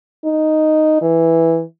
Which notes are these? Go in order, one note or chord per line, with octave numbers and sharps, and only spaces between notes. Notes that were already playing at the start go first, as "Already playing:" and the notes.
D#4
E3